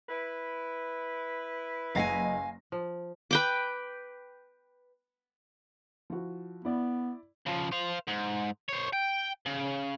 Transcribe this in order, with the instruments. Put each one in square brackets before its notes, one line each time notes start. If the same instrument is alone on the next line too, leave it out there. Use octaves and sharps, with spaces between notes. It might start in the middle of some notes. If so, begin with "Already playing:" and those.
[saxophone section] E4 B4
[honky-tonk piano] F#1 D#5 A#6 [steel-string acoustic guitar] F5 F#5 G#5
[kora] F3
[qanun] B4 G5 D6
[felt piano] F3 E4 F#4
[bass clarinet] B3 [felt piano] E4 D5
[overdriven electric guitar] C#3 F3
C5 F5
G#2
C5 C#5
G5
C#3